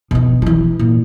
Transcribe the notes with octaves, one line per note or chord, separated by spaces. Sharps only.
B2 D#3
E3 F3
A#2